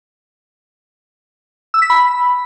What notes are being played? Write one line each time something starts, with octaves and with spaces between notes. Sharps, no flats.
E6
B6
B5